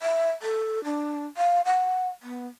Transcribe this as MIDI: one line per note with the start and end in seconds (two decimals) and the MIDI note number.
0.02 0.30 76
0.42 0.83 69
0.84 1.26 62
1.37 1.61 77
1.65 2.08 78
2.23 2.47 59